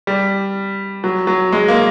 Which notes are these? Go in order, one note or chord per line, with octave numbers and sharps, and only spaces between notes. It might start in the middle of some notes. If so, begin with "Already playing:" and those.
G3
F#3
F#3
G#3
A#3